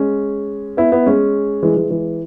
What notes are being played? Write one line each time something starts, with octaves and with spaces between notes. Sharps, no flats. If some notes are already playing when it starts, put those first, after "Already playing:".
Already playing: G#3 C#4
B3 E4
B3 E4
G#3 C#4
E3 G#3
E3 G#3
E3 G#3